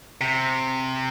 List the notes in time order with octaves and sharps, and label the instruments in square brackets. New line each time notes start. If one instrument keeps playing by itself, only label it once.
[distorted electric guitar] C3